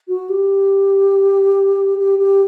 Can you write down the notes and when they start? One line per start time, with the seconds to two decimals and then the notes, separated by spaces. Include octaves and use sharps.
0.08 F#4
0.29 G4
1.99 G4
2.19 G4